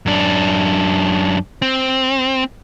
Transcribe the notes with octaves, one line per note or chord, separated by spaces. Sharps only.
F#2 D4
C4